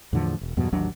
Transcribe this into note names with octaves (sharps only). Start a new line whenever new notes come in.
E2 A2 D3 F3
E1
E2 G2 B2 F#3
A1 D#2 F#3 D4